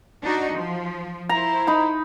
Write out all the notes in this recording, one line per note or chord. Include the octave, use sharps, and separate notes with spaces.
D4 D#4 F#4
F3
E4 C5 A#5
D#4 B5